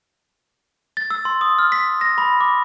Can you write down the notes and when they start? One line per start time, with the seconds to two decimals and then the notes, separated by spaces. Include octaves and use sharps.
0.97 A6
1.10 E6
1.25 C6
1.41 D#6
1.59 F6
1.72 B6
2.01 A#6
2.18 B5
2.41 D6